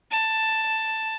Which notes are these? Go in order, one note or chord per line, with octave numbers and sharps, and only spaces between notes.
A5